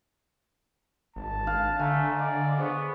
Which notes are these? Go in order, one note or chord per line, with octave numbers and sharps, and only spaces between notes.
G#1 A5
D4 F5 F#6
D3 A3 E5 G#5 A#5
D5 D#5 F5 C6
B3 G#4 C5 C#6